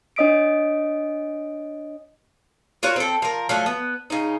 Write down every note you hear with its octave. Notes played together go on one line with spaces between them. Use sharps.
D4 C#5 D#5 D#6 B6 D7
F4 F#4 A#4 C#5
C4 A4
F3 A#4
F3 F#3 A3
B3
C#3 D#4